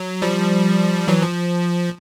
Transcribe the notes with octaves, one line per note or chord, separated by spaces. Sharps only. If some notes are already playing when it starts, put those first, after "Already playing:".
Already playing: F#3
F3 G3
E3 F#3
F3